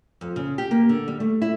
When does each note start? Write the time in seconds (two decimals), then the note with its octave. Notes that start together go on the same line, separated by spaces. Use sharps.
0.21 F2
0.36 C#3
0.58 G4
0.71 A#3
0.89 D3
1.08 G3
1.20 A3
1.42 E4